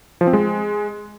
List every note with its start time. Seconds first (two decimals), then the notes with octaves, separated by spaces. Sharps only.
0.21 F3
0.27 C4
0.33 G#3